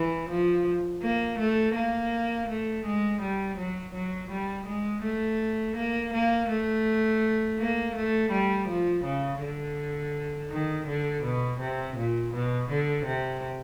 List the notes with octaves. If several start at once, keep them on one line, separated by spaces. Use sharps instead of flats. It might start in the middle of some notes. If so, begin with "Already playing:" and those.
Already playing: E3
F3
A#3
A3
A#3
A3
G#3
G3
F#3
F#3
G3
G#3
A3
A#3
A#3
A3
A#3
A3
G3
F3
C#3
D3
D#3
D3
B2
C3
A#2
B2
D3
C3